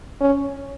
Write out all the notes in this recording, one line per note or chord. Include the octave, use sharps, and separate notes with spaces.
C#4